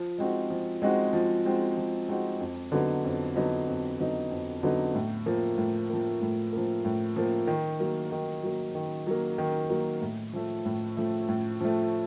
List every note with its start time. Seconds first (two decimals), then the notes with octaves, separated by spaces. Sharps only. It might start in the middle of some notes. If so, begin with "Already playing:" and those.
Already playing: F3
0.18 G#3 C4 D#4 F#4
0.50 F3
0.82 G#3 C4 D#4 F#4
1.13 F3
1.45 G#3 C4 D#4 F#4
1.77 F3
2.08 G#3 C4 D#4 F#4
2.40 F2
2.72 D3 F#3 B3 D#4
3.04 F2
3.36 D3 F#3 B3 D#4
3.68 F2
3.99 D3 F#3 B3 D#4
4.31 F2
4.63 D3 F#3 B3 D#4
4.95 A2
5.26 F3 A#3
5.58 A2
5.90 F3 A#3
6.22 A2
6.53 F3 A#3
6.85 A2
7.16 F3 A#3
7.47 D#3
7.80 F#3 A#3
8.12 D#3
8.43 F#3 A#3
8.75 D#3
9.07 F#3 A#3
9.38 D#3
9.70 F#3 A#3
10.02 A2
10.33 F3 A3
10.65 A2
10.97 F3 A3
11.29 A2
11.61 F3 A3